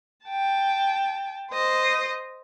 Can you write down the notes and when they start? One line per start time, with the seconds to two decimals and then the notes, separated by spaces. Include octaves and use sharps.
0.26 G5 A5
1.51 C5 D#5